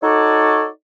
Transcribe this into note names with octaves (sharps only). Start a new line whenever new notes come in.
D#4 F#4 A4 C#5 D5